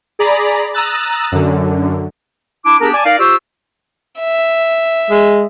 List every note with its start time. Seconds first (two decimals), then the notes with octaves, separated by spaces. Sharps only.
0.19 G#4 D5 A#5 B5
0.74 A#5 D#6 E6 F#6 A6
1.32 F#2 D3
2.65 D4 E4 D6
2.81 B3 D4 G4 G#4 A#4
2.94 D5 G#5 A5 D6
3.05 D#4 A#4 D5 F5
3.19 F4 G4 C5 C#6 E6
4.19 E5
5.10 G#3